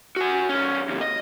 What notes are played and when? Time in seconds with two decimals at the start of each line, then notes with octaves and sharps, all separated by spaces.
0.16 F#4 G#5
0.49 B1 C#4
0.89 D#2 C3
1.01 D#5